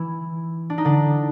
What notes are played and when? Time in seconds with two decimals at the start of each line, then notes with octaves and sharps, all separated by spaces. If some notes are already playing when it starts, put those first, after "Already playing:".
Already playing: E3 E4
0.70 D4
0.78 D#4
0.85 D3 D4